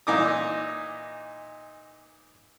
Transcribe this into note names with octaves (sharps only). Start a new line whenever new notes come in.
A#2 E3 D#4 D6 D#6